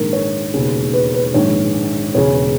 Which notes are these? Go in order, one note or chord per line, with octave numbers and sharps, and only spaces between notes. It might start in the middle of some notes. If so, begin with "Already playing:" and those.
Already playing: A#1 G#2 D#3 A#4
C#5
E1 D#2 C#3
B4
B4
A#1 G#2 D#3 C#5
E1 E2 C#3 C#5